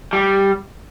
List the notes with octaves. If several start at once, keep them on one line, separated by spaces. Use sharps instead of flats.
G3